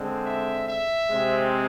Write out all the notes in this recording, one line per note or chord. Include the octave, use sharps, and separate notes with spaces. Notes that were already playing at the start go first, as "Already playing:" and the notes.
Already playing: D3 G#3 C4
E5
E5
C3 G#3 C4